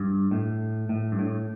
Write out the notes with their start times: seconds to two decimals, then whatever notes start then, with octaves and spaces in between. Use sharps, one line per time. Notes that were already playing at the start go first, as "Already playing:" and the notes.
Already playing: G2
0.31 A2
0.89 A2
1.12 G2
1.19 A2